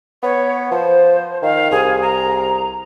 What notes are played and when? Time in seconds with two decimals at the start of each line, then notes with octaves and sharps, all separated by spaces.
0.23 B3 C#5
0.71 F3 C5
1.42 D#3 F5
1.71 C2 G#4
2.02 A#5